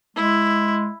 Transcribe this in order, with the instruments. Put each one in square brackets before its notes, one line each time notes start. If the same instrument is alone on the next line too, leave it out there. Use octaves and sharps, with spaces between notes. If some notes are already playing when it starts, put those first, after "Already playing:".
[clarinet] G#3 [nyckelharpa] E4